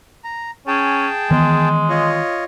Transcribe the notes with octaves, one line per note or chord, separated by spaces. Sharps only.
A#5
C#4 G#4 G5 A5
D#3 E3 G#3 B3
F4 C#5 D#5